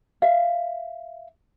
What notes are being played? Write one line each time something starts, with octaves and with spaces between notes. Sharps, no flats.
E5 F5